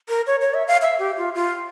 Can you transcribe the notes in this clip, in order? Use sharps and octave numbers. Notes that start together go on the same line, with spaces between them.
A#4
C#5
C#5
E5
F5
E5
G4
F4
F4